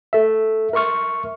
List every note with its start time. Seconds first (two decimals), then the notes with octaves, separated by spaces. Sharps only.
0.13 A4 E5
0.73 A#4 E5 C6 C#6 F6